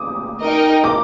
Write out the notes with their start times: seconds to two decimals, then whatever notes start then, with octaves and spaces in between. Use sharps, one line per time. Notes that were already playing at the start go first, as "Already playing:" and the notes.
Already playing: D6 D#6
0.42 D#4 A#4 D#5 G5
0.84 D6